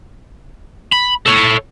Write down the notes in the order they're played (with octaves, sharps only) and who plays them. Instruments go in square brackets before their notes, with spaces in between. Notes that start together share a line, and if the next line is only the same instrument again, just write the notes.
[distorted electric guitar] B5
A4 C#5